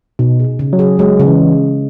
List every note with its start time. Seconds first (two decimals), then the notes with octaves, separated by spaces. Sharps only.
0.19 B2 D#4
0.40 G#4
0.59 C#3
0.73 F#3
0.79 G#4
0.99 F#3 G#3
1.20 C#3
1.27 E3